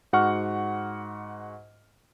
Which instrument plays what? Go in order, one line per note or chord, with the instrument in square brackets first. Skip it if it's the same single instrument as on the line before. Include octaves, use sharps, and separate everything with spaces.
[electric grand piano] G#2 F#4 F#5 C#6 F6